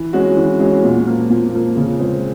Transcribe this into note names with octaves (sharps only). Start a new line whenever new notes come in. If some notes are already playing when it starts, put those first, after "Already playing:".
Already playing: E3
G#3 C#4 F#4
E3
G#3 C#4 F#4
A#2
F3 A#3
A#2
F3 A#3
C#3
F3 G#3 C4